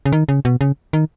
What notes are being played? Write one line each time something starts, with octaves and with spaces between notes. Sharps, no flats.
C#3
D#3
C#3
B2
C#3
D#3